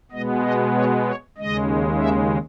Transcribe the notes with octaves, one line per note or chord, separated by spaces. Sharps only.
B2 G#3 B3 D#5
D#5
C#5
C#5
D#2 C#3 G#3 D#5
E5